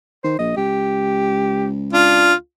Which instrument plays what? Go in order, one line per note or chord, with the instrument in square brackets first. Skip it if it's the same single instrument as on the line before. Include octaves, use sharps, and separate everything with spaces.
[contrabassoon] D#3 [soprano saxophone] C5
[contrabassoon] A#1 [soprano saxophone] D#5
[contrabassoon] C#2 [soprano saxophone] G4
[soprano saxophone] D4 [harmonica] F4